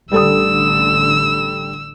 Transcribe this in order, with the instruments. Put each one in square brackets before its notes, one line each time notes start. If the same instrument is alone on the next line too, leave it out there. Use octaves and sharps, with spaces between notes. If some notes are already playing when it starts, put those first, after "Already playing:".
[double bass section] A1 D3 [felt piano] G3 A4 D#6 [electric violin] E6